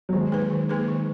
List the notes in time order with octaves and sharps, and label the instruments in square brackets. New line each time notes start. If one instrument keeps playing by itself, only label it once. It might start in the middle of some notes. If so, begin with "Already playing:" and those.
[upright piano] F#3
[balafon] D#3 [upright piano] G#3
[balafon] A#3 D#4 G#4 B4
D#3
A#3 D#4 G#4 B4
D#3